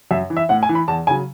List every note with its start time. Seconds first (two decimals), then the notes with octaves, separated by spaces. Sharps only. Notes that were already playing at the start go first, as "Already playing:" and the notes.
0.11 F#2 E5
0.30 E3
0.37 E5
0.49 A2 F#5
0.63 G#5
0.69 E3
0.75 B5
0.88 E2 A5
1.07 C#3 F#3 G#5